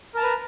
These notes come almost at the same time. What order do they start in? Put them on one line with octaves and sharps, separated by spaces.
A#4 A5 A#5 B4